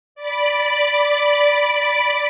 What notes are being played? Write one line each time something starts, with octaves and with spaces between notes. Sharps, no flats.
D5 B5 D6